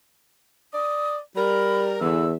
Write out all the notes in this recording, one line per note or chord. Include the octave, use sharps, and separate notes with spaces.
D5 D#6
G3 A#4 B5
E2 D3 E3 E6